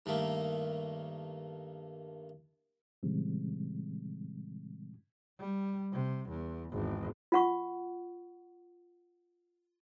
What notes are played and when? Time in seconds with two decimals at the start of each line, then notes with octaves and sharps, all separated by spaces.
0.06 G2 D#3 A3 A#3
3.03 A#2 C#3 E3 G3 G#3 C4
5.39 G3
5.92 C3
6.29 E2
6.71 G#1 E2
7.32 F4 F#5 C#6